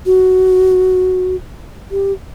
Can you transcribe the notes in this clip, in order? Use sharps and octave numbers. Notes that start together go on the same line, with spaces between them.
F#4
G4